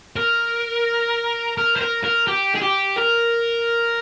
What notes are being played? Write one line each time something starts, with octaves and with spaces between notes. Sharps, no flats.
A#4
A#4
C5
A#4
A#4
G4
G#4
G4
A#4